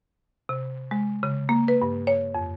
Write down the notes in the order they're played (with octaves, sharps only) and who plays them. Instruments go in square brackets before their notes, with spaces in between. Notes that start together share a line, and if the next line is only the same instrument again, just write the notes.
[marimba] C3
G#3
C#3
A#3
B4
G2
C#5
F2